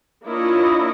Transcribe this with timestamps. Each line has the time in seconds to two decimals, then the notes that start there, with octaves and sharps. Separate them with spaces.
0.24 A#3 D4 E4 F4 C#5 D#5